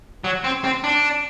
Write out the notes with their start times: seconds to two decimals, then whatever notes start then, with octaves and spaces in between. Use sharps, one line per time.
0.24 F#3
0.44 C4
0.64 C4
0.84 D4